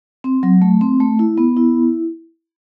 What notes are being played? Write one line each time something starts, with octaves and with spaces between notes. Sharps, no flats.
C4
F#3
A3
C4
A3
E4
B3
E4